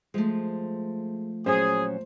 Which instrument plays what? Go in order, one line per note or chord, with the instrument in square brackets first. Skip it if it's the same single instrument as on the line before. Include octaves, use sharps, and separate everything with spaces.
[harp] F3 A3 [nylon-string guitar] G#3
[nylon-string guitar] A#2 F#3 C#4 [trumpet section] G#4 [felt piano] C5